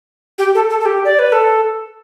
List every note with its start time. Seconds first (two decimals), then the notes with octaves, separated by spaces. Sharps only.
0.38 G4
0.55 A4
0.70 A4
0.80 A4
0.85 G4
1.05 D5
1.19 B4
1.32 A4